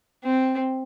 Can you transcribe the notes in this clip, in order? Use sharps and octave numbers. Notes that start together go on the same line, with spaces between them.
C4